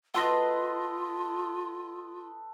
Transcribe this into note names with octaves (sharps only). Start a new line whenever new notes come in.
F4 A4 B4 D#5 F#5 C6 A#6